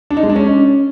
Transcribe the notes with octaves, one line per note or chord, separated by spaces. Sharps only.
D4
D#4
G#3
D4
C#4